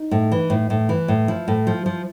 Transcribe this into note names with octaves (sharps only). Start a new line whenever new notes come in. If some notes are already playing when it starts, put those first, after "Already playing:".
Already playing: D#4
A2
E3
A2
A2
E3
A2
F3 E4
A2
F3
F3